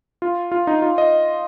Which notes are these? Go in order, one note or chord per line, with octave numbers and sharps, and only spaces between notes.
F4
F4
D#4
F4
D#5